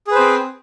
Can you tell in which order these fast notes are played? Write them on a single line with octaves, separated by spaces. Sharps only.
G#4 B4 C5 C4